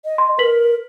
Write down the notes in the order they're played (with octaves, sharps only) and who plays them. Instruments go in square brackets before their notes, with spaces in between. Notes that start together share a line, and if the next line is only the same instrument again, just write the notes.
[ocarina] D#5
[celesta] C6
[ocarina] A#4 [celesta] B4 B6 F#7